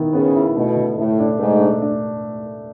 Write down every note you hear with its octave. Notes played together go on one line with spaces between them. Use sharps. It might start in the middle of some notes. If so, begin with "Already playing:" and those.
Already playing: D#3 B3 E4
C#3 B3
E4
B2 A3
D3
A2 A3
D4
G#2 A3
D4
D4